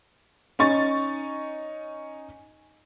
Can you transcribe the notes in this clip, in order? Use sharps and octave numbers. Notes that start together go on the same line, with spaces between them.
C#4 D#4 C#6 A6